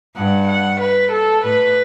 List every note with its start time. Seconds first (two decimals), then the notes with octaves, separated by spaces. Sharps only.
0.16 G2 F#5
0.48 F#5
0.81 B4
1.12 A4
1.44 A2 B4